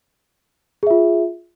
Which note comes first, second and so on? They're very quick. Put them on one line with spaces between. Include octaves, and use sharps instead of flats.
G#4 E5 F4